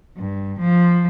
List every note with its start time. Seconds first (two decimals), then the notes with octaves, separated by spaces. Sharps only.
0.16 G2
0.59 F3